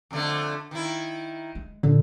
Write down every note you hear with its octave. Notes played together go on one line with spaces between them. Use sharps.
F2 D3 A3
D#3 E4
G#3
A#2 D3